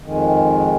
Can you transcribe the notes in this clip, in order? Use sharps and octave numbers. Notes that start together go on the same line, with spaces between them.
F2 D#3 G#3